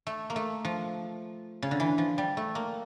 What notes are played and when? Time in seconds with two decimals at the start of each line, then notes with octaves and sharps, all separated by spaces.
0.07 A3
0.30 A#3
0.36 A3
0.65 F3
1.62 C#3
1.71 D3
1.80 E3
1.98 F3
2.18 G3
2.37 A3
2.55 A#3